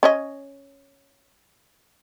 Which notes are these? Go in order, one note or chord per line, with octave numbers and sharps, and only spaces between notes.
C#4 C#5 D#5